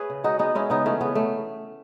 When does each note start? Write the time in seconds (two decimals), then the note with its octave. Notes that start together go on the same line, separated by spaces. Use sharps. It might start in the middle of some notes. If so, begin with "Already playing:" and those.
Already playing: G#4 B4 C#5 E5
0.10 C#3
0.24 G#3 D#4 F#4
0.39 G#3 B3 D#4
0.55 G#3 C#4 E4
0.70 C#3 B3 D#4
0.85 E3 A3 C#4
1.01 C#3 B3
1.15 E3 A3